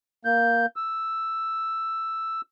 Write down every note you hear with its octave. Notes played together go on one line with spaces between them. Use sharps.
A#3 G6
E6